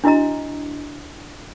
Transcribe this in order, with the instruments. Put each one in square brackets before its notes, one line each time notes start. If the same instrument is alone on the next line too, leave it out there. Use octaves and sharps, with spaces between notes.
[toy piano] D4 E4 F#4 D#5 A#5